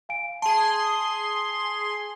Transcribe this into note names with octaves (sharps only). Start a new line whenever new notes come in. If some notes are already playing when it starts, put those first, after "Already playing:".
F5 G#5 D7
G#4 A5 C6